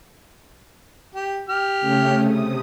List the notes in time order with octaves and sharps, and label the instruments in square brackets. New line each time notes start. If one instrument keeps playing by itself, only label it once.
[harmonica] G4
G4 F6
[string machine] C#3 A3 C#4
C3 D#6